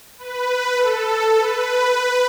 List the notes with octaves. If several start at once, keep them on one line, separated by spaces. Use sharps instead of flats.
B4
A4
B4